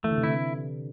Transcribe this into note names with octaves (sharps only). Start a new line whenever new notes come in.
E3 A3
D3
C3
D3 E4